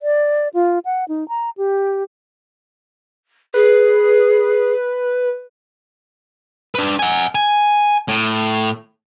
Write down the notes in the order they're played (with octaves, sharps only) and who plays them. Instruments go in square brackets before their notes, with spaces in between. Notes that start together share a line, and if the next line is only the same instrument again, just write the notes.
[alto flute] D5
F4
F#5
D#4
A#5
G4
[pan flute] G#4 [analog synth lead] B4
[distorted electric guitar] D4 B4
F#5 G#5
G#5
A2